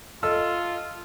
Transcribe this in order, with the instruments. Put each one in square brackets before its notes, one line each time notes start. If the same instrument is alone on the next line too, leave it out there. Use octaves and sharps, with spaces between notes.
[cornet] F4 [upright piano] A4 D#5 E6